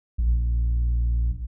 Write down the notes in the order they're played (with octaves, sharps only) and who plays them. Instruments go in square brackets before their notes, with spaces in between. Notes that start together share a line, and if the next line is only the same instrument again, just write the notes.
[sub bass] A#1